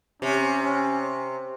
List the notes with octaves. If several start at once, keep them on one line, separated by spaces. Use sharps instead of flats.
C3 C#4
C#4